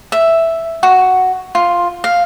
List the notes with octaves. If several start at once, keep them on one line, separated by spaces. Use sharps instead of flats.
E5
F#4
F4
F5